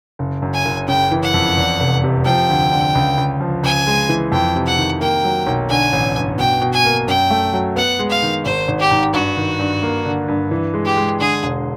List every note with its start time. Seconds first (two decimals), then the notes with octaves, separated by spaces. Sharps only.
0.19 F#1
0.42 F#2
0.54 G#5
0.65 F#1
0.88 C#3 G5
1.11 E3
1.23 F#5
1.34 F2
1.58 E2
1.80 F1
2.04 C3
2.25 F3 G5
2.49 D2
2.72 D3
2.95 C#2
3.18 C#2
3.40 F3
3.63 C#2 G#5
3.87 G#3
4.09 E3
4.32 F2 G5
4.56 C3
4.66 F#5
4.77 D#3
5.00 A#3 G5
5.24 F#3
5.47 B1
5.69 D3 G#5
5.93 A1
6.16 G2
6.38 B2 G5
6.62 B2
6.73 G#5
6.85 A#3
7.08 F#2 G5
7.30 A3
7.53 F#3
7.76 B3 F#5
7.99 G#3
8.10 F5
8.23 D#3
8.45 G#1 C5
8.68 G#1
8.79 G4
8.91 G#2
9.13 G2 F#4
9.37 D#3
9.59 G2
9.83 A#3
10.06 D3
10.28 G2
10.51 E3
10.74 G#3
10.85 G4
10.97 G#3
11.20 D3 G#4
11.43 E1